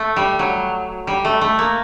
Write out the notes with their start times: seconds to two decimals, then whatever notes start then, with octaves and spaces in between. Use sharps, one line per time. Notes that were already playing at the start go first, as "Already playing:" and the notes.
Already playing: A3
0.16 G3
0.39 F#3
1.07 G3
1.25 A3
1.41 A3
1.59 A#3